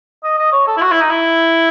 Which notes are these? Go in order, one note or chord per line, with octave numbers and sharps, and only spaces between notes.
D#5
D#5
C#5
A4
E4
F#4
E4
D#4
E4